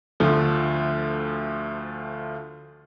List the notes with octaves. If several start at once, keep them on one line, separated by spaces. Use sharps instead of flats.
D2 D3 F3 A3